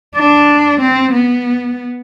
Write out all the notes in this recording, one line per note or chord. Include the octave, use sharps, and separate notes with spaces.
D4
C4
B3